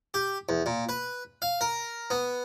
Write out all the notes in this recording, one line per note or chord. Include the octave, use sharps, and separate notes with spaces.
G4
E2
A#2
B4
F5
A#4
B3